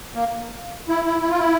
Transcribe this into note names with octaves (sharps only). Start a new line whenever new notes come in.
A#3
E4
E4
E4
F4
E4